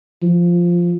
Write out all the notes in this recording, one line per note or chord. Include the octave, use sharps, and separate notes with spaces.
F3